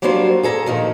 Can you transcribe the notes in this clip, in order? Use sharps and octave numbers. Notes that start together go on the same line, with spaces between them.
F#3 G3 A#3 D4 F4 C5
G#4 A4 A#5
A#2 D#3 F3